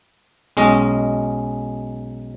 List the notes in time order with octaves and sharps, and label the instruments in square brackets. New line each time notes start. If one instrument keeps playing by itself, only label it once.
[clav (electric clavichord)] B1 G#3 C#4 D#5